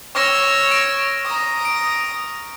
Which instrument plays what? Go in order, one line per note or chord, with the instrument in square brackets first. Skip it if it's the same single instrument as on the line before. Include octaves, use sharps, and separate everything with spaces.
[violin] C#5 E6 [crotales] C#6 F6 A#6
[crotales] A#6 D7
[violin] A#5 D#6
[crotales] D7